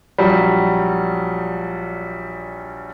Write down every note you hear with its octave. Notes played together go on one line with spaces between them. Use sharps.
A#1 F#3 G3